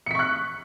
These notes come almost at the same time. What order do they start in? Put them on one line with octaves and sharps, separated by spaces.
C#7 B6 C#6 F#6